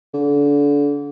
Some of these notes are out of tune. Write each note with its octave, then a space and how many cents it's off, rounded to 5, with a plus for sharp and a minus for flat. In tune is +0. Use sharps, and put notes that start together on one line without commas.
D3 -30